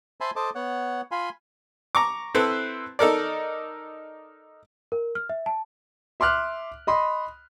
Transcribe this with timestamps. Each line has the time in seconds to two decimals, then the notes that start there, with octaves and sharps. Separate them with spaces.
0.21 C5 E5 G#5 A5 B5 C6
0.36 A4 C5 D#5 A5 D6
0.55 B3 C#5 F#5
1.11 F4 F5 G#5 B5 C6
1.95 A#5 C#6 D6
2.34 C4 E4 A4 B4 C5
2.99 D#4 A4 A#4 D5
4.92 A#4
5.15 F6
5.29 E5
5.46 A5
6.20 E5 C6 D6 F6 F#6
6.87 D#5 B5 C6 D#6